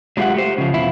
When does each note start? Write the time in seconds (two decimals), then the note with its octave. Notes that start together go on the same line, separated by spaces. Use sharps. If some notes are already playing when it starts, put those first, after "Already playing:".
0.17 F#3 G#3 F4 G4 E5 F#5
0.34 A3 G4 C5
0.58 C#3 F3
0.74 E2 B2 E4 F4